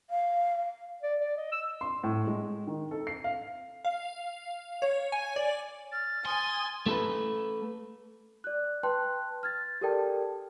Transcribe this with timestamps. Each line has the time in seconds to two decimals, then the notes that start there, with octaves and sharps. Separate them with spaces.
0.10 F5
1.02 D5
1.21 D5
1.37 D#5
1.52 E6
1.81 C6
2.04 A2
2.27 G#3
2.67 D#3
2.91 A4
3.07 C7
3.24 F5
3.85 F5
4.82 C#5
5.12 G#5
5.36 D5
5.92 F6 A6
6.25 G#5 C6 D#6
6.86 A3 A4 B4
8.44 D5 F#6
8.83 B4 G5 A5 C6 F#6
9.43 F6 G#6 A6
9.81 G4 A4 A#4 D5 G5 A5